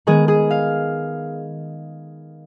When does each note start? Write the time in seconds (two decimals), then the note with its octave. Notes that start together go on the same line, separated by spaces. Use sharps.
0.07 D#3 G#3 B3 G#4
0.28 G#4
0.51 F5